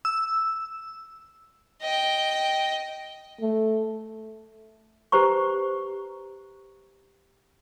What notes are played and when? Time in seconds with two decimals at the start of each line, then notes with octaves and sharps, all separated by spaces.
0.05 E6
1.82 D#5 G5
3.41 A3
5.12 G4 B4 C5 A#5 C#6